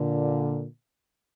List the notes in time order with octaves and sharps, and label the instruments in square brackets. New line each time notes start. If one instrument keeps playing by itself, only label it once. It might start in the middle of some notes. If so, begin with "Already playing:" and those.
Already playing: [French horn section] A#2 D3